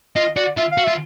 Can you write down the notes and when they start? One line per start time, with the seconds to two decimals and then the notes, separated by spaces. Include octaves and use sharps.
0.16 F4 D#5
0.36 F#4 D5
0.57 F4 E5
0.72 F5
0.78 F#4
0.84 F4 E5